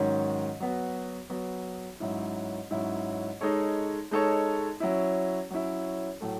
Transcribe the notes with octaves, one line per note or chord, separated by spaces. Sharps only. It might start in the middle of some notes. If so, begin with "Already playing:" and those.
Already playing: G#2 D#3 F#3 C#4
F#3 B3 F#4
F#3 B3 F#4
G#2 F#3 C#4 E4
G#2 F#3 C#4 E4
G#3 D#4 A4 C#5
G#3 D#4 A4 C#5
F#3 C#4 E4
F#3 C#4 E4
A2 F#3 A3